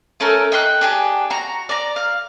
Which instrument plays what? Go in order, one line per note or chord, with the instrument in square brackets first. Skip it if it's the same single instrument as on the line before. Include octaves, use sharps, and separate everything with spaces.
[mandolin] A3 C#4 A4 A#4
D#4 G5 C6 F#6
D4 G4 G#4
F#4 A#5
D5 A#5
F5